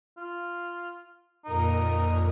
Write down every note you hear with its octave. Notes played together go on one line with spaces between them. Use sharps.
F4
F2 A#2 D#4 A#4